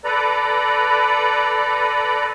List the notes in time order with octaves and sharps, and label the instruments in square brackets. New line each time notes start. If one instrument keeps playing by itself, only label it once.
[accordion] A4 B4 D5 A#5